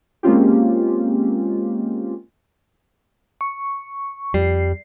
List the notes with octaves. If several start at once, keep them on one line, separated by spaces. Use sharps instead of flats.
G#3 A#3 C4 C#4 F4 G4
C#6
F2 G3 C7